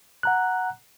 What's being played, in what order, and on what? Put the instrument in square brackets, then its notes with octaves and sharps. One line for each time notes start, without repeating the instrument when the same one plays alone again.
[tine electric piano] F#5 A#5 F#6